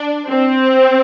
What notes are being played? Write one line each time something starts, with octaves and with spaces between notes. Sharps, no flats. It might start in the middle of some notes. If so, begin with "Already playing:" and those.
Already playing: D4
C4